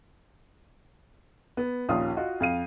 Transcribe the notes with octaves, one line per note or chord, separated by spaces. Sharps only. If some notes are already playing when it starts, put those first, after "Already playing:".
B3
A#1 D#2 C#4 F4 D#6
F4 F#4 D#5
F2 F5 D#7